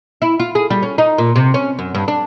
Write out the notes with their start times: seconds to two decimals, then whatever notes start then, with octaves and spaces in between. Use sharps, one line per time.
0.22 E4
0.39 F4
0.55 G#4
0.70 G3
0.82 C#4
0.98 D#4
1.18 A#2
1.36 C3
1.54 C#4
1.79 F#2
1.95 G2
2.08 D4